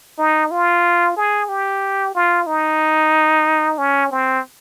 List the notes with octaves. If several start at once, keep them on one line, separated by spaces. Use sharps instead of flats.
D#4
F4
G#4
G4
F4
D#4
C#4
C4